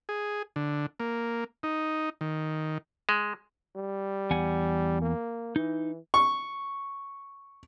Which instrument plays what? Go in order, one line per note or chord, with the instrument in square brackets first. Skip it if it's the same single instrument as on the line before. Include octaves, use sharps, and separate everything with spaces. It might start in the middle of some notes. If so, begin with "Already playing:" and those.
[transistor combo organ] G#4
D3
A#3
D#4
D#3
[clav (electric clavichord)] G#3
[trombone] G3
[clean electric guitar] E2 F#5 G#5
[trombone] A#3
[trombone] E3 [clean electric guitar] D#4
[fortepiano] C#6